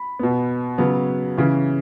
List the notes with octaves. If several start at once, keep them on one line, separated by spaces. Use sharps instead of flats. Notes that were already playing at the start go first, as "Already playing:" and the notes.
Already playing: B5
B2 B3
C#3 F#3 B3
C#3 E3 C#4